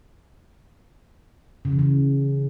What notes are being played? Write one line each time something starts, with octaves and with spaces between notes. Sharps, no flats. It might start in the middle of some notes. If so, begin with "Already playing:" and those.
C#3
E3
C#3